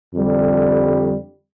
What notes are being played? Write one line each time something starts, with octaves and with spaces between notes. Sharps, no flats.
F2 D3 G3